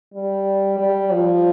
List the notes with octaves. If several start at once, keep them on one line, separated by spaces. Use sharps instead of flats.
G3
G3
F3